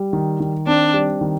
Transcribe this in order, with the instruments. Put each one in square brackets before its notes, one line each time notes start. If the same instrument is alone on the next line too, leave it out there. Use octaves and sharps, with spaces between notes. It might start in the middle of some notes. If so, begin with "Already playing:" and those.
Already playing: [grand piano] G3
D#3
D#3
[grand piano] C4 [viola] D4
[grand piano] G3
D#3